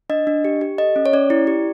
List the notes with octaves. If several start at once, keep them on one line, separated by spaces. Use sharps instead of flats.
D4 D#5
D4
G4
G4
A4 D#5
C#4
C#5
C#4 D5
E4
G4